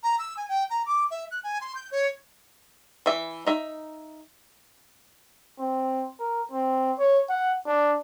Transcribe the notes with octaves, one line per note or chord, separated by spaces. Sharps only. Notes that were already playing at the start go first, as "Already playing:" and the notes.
A#5
E6
G#5
G5
A#5
D6
E5
F#6
G#5
C6
G6
C#5
E3 E5
D#4 E5
C4
A#4
C4
C#5
F#5
D4